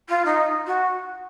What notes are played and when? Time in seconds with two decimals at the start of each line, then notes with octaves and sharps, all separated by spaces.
0.09 F4
0.25 D#4
0.66 F#4